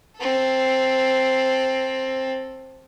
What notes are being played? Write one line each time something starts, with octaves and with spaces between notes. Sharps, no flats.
C4 A4